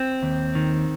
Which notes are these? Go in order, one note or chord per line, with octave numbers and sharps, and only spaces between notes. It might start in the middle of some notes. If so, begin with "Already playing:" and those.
Already playing: C4
D#2
D#3